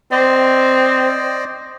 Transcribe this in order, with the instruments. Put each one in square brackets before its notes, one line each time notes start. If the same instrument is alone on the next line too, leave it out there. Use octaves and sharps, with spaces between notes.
[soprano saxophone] C4 [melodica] C5 D5 D#5